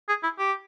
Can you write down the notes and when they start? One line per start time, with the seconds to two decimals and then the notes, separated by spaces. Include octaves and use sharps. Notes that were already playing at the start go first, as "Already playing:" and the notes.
0.09 G#4
0.23 E4
0.39 G4